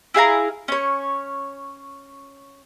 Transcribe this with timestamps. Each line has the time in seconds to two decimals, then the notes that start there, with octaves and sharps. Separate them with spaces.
0.14 E4 G#4 F5 A#5
0.68 C#4 C#5